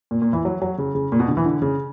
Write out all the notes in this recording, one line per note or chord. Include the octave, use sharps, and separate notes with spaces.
A#2
A#2
E3
F#3
F#3
C#3
C#3
A#2
B2
D3
E3
D3
C#3